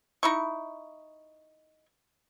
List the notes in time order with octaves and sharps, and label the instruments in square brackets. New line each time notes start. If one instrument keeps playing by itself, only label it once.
[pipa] D#4 E4 C#6